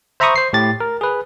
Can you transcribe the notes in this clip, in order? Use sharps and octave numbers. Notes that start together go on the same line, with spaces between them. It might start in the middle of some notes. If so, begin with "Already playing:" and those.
C5 E5 A#5 B5 C#6 D#6
C5 C7
A2 G4 A6
A#4
G#4 B4